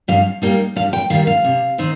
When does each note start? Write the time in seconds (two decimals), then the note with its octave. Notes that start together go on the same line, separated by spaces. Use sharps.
0.08 G2 F5
0.42 G3 A#3 D#4 G5
0.76 G2 F5
0.93 G5
1.10 D#3 G3 A#3 F5
1.27 F5
1.45 C3
1.78 D#3 C4 D#4